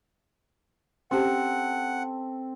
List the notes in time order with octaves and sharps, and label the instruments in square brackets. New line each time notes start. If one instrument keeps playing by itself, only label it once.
[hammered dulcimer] C4 A4 [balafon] C#4 G4 [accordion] F#5